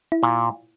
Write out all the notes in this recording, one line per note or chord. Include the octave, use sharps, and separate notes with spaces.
E4
A#2